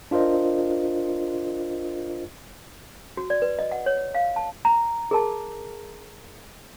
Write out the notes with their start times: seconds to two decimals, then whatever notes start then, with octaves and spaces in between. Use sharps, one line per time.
0.11 D4 F4 A#4 C5 D#5
3.17 F#4
3.30 D5
3.42 B4
3.59 D#5
3.71 F#5
3.86 C#5
4.15 F5
4.36 A5
4.65 A#5
5.11 G#4 A#4 A5